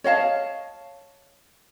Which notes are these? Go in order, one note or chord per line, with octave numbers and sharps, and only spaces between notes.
C#5 D#5 F5 A5